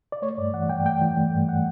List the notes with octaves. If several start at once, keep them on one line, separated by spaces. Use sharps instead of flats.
D5
A3 C#5
G2 D5
E3 F#5
G2 G5
A3 G5
E3
A3
G2
F#5